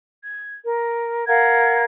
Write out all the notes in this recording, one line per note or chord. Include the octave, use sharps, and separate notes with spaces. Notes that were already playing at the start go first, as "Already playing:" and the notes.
G#6
A#4
A#4 F5 F#5 G#6